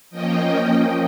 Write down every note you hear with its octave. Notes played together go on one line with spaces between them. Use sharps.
F3 A#3 C#4 D#5 G5